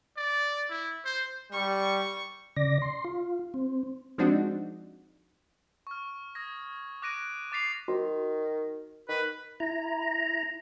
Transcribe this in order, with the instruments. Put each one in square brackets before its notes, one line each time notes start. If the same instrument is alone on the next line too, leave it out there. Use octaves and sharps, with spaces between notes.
[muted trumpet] D5
E4
C5
[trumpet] G3 [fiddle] C#6
[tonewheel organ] C#3 D5 A#6
C6
F4
C4
[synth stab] F3 G#3 C4 D4 D#4 F#4
[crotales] C#6 F6
D#6 G#6 A#6
D6 F#6 A#6 D7 D#7
D6 A6 B6 C7 F7
[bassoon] D#3 [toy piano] F#4
[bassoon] D#3 [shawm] B4
[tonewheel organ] E4 A#5